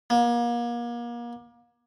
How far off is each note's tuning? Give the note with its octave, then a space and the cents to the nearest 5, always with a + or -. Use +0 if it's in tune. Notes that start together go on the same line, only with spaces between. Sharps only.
A#3 +35